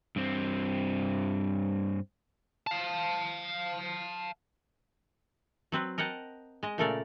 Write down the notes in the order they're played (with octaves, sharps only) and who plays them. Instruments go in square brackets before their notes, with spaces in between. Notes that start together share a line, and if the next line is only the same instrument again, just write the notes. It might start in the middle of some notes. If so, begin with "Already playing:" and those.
[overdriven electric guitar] G2 C4
[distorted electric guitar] F5 A5
[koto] F#3 C4 B4
A#4 D#5 F#5 G5 A5
G#3 D#5
A#2 C#3 A3 A4 A#4 D5